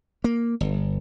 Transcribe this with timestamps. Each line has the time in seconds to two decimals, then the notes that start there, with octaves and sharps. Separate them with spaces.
0.24 A#3
0.61 G1